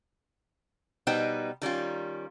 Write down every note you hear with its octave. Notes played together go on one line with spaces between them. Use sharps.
B2 G3 B3 D#4 C5 G5
D#3 G3 C#4 F4